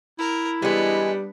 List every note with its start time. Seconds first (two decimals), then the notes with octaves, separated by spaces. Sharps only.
0.19 E4 A#4
0.62 E3 G3 G#3 B3 D4